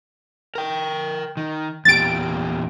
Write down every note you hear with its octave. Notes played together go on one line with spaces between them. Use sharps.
A#4 G5
D#3
E2 A#2 G4 A6 D7